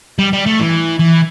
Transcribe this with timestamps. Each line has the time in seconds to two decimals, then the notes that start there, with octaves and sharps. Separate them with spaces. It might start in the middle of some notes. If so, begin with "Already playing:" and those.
0.19 G3
0.33 G3
0.46 A3
0.59 E3
0.99 E3